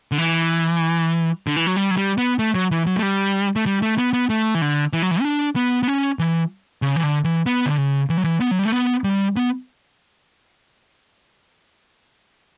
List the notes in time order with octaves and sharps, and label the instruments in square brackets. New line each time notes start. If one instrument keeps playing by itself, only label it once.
[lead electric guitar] D3
E3
D3
E3
F#3
G3
F#3
G3
B3
A3
F#3
E3
F#3
A3
G3
A3
G3
A3
B3
B3
A3
E3
D3
E3
F#3
E3
C#4
D4
B3
B3
C#4
E3
C#3
E3
D3
E3
B3
D3
C#3
E3
F#3
E3
B3
F#3
G3
A3
B3
G3
B3